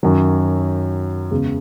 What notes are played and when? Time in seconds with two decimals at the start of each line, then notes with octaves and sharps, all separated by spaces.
0.03 F#2 D#3 F#3
1.31 E2 C#3 G#3